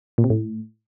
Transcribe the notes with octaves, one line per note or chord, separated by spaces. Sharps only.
A#2
C3
A2